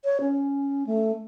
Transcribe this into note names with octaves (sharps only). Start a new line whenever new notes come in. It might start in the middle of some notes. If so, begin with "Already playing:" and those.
C#5
C#4
A3